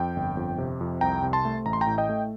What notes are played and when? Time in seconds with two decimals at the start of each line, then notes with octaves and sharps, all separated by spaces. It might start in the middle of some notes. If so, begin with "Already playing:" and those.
Already playing: F2 G5
0.16 G1
0.37 F2
0.58 C3
0.81 F2
1.01 C2 G5 A#5
1.23 C3
1.33 A5 C6
1.45 A3
1.66 A1 A#5
1.73 C6
1.81 G5 A#5
1.87 A2
1.98 D#5 G5
2.09 A3